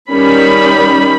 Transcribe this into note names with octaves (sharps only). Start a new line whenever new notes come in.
D#3 G3 C#4 B5